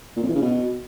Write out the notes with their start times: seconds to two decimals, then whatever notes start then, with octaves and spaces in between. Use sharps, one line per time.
0.16 A#2
0.23 F2
0.29 E3
0.35 C#3
0.42 B2